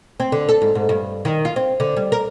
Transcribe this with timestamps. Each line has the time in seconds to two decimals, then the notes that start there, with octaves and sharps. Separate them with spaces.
0.20 C4
0.32 D3
0.49 A4
0.62 G#2
0.75 G#2
0.89 G2
1.25 D#3
1.45 F4
1.56 C4
1.80 D3
1.97 G3
2.12 A#4